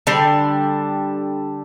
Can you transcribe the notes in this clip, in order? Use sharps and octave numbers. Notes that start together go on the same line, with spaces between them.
D3 G3 D4